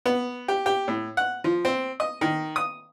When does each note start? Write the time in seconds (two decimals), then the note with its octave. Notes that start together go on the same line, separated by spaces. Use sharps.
0.05 B3
0.48 G4
0.66 G4
0.88 A2
1.17 F#5
1.44 F3
1.65 C4
2.00 D#5
2.21 D#3
2.56 D#6